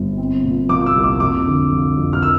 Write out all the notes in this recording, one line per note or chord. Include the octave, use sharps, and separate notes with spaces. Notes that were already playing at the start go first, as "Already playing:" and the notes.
Already playing: G1
C4
A#2
F3 D6
E6
C2
D6
F2 D6
D3
F3
F2
F6
E6